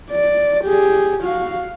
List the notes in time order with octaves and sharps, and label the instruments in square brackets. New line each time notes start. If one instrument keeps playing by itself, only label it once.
[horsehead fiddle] D5
G4 G#4
F#4 F5